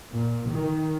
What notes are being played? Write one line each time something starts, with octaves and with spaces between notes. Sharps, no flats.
A#2
D#3